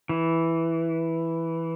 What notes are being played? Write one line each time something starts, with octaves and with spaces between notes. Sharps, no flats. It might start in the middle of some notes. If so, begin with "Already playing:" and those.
E3